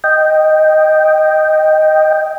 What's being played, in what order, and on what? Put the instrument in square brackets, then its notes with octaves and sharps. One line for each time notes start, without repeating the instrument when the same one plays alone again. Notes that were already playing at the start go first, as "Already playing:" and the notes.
[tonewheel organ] D#5 G5